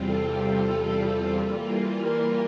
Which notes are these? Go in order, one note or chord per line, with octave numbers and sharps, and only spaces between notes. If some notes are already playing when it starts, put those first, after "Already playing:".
Already playing: E2 C3 G3 C4 F4
A4
E3 G3 A#3 F4
A#4